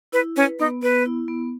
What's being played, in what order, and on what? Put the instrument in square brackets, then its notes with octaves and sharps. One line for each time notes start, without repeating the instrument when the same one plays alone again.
[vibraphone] E4 [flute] B4
[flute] C#4 [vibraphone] B4
[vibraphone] B3 [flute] D#4
[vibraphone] B3 [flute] B4
[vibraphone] E4
B3